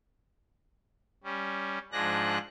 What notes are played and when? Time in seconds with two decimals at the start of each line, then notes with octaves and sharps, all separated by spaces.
1.24 G3 C#4
1.92 G#2 F3 D4 G#4 F#6 A#6